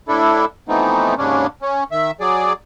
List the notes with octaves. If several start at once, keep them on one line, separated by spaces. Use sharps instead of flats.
A2 D4 E4 A4
E3 F3 A3 B3 C4 D#4
D#2 G#2 C#3 C#4 D4
C#4
D#3 E5
F#3 G#4 D5